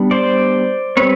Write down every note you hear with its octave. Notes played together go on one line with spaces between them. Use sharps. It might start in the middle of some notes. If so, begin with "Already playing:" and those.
Already playing: G3 B3 D4
C5 D5
G3 C4 B4 C#5